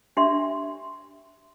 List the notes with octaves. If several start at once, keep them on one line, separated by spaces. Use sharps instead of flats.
D4 G4 D5 E5 G5 C6